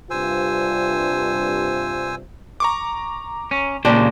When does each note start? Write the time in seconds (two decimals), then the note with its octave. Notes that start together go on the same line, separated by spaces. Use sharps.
0.10 G2 C3 F4 C5 G#5 E6
2.60 A#5 C#6 D6
3.51 C#4
3.85 A#2 C#3 A#3 D4 G4 C5